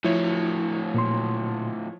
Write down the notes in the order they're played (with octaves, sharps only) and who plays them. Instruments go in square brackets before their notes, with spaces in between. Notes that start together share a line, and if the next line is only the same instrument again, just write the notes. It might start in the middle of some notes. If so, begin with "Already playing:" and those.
[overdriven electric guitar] A2 F#3 [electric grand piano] F3 C#5 [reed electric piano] E4
[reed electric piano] A#2 C6